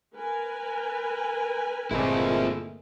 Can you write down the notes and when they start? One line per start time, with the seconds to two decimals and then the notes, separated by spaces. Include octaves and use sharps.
0.16 A#4 B4 G#5
1.91 G1 A#2 G#3 A3 C4 E4